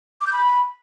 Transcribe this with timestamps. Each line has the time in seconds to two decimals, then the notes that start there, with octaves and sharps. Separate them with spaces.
0.21 D6
0.27 G6
0.33 B5